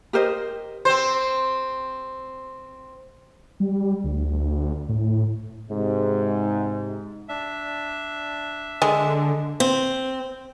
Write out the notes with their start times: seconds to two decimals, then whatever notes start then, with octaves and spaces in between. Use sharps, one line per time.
0.13 G4 A#4 C5 D#5
0.85 C4 C5
3.60 G3
4.04 D2
4.89 A2
5.70 G#2 C3
7.29 D4 E5
8.82 D3 G#3
9.60 C4